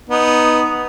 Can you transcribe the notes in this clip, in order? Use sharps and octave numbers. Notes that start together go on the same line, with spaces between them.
B3 D#4